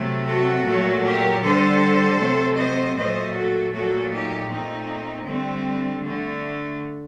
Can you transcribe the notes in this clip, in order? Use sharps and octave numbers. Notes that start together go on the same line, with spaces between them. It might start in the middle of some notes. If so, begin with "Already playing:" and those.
Already playing: C3 F#3 A3
F#4 A4
A#2 F#3 A3
G4 A#4
D3 G3 A4 C5
C3 F#3 A3
C5 D#5
A#2 F#3 A3 C5 D#5
F#4 A4
A#2 F#3 A3 F#4 A4
D#4 G4
A#2 A3 C4 D#4
D3 G3 A3 C4
D3 A3